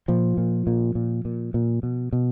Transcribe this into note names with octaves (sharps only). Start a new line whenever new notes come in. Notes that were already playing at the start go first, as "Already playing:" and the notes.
A#2 F3
A#2
A#2
A#2
A#2
A#2
B2
B2